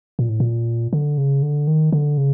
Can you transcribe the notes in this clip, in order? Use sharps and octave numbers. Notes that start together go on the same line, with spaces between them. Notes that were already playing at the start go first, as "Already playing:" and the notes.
A#2
A2
A#2
D3
C#3
D3
D#3
D3
C#3